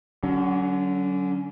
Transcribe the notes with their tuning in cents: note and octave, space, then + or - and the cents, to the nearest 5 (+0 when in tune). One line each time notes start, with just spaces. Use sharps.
D3 -5 F#3 +25 C#4 +20